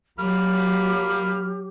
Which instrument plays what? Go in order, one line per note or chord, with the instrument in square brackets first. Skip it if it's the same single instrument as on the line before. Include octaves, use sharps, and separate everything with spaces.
[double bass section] F#3 [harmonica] A#3 B5 F6 [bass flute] G4